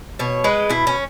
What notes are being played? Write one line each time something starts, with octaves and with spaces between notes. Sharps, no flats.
B2 C#5
G#3 B4
B2 E4
C#4